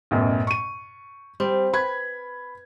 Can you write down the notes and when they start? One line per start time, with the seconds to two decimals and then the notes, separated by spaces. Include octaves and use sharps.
0.11 A1 F#2 B2
0.47 C#6 D#7
1.40 G3 C4
1.73 B4 B5 G#6